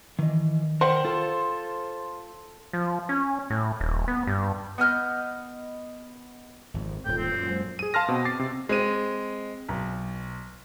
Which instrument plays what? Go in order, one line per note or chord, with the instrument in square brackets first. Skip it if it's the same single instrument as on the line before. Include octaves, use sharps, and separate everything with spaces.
[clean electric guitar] D#3 D#5 [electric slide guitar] E3
[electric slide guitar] A#4 F#5 G5 [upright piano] C5
[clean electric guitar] F4 [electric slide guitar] A4
[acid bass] F3
C#4
A2
D#1
B3
G2
[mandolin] B3 D#5 F6 G6
[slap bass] G#1 F2
[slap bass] D#1 G#2 [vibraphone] F4 A4 [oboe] G5
[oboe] C4 [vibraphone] F4
[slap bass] F#2 A#2
[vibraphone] F#3 G#3 C5
[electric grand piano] G#4 D#7
F5 A5 C6 F6 A#6
B2 C4
D6 A6 C7
C3
[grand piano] G#3 C4 D#7
B1